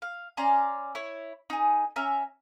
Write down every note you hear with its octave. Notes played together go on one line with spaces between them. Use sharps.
F5
C#4 D5 A#5 C6
E4 C#5
D#4 G#4
C#4 E5 A#5